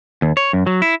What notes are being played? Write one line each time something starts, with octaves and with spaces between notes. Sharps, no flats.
D#2
C#5
F#2
F#3
E4